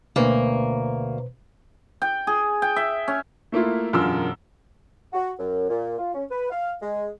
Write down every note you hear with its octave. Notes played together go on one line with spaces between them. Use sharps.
D2 B2 A#3 B4 C5
G5
G#4
G5
E5
C#4
A3 A#3 E4 F4
E1 F#2 D3 F4 A#4 E6
F#4
F#2
A#2
F4
C#4
B4
F5
G#3